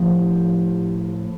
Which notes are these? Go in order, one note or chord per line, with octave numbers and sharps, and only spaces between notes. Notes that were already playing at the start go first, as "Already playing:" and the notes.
Already playing: A2 F3 G4